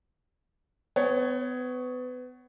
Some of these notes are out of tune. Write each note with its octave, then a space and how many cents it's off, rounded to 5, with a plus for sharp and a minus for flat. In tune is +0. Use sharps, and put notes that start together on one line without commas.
B3 +30 C#5 +0